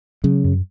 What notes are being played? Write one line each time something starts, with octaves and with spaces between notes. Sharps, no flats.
C#3 F#3
F#2